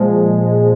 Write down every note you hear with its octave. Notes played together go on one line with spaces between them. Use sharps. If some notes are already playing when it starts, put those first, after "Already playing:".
Already playing: A#2 F3 G#3
A#2